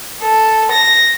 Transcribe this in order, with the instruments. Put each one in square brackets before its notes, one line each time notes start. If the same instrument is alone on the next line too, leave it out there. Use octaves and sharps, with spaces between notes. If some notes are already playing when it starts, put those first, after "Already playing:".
[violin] A4
A#6